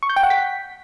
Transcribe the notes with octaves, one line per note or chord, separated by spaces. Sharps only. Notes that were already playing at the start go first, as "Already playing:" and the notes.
C#6
G6
G5
F#5
B6